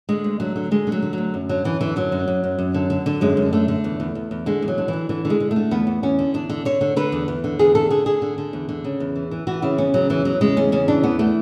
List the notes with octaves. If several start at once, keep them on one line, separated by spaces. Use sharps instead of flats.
D3 G#3
D2
D3 F#3
D3
D3 G#3
D3
F#3
D3
D2 F#3
F#2
D3 F#3
F#2 E3
D3 E3
F#2 F#3
F#2
F#2
F#2
F#2
D3
D3
D3
F#2 G#3
F#2
D3 A3
D3
E2
E2
E2
E2
D3 G#3
E2
F#3
D3
D3 E3
D3 E3
D3
G#3
D3
A3
D3
E2 B3
E2
E2 C#4
D3
E2 D4
D3
D3 C#5
D3
D3 B4
E2
E2
D3
E2 G#4
D3 A4
D3 G#4
D3 G#4
D3
D3
E2
D3
C#3
E2
E3
E3
E3 F#4
C#3 E4
E2 C#4
C#3 F#3
E2 E3
E2 F#3
C#3 G#3
E2 C#4
C#3 C#4
E3 D4
E2 B3
E3 A3